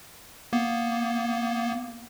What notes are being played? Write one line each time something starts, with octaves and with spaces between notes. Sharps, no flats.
A#3 B3